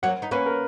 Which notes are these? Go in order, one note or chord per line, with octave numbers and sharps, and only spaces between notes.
F#3 A#3 F#5
B3 D#4
A#3 C#4 B4
A#4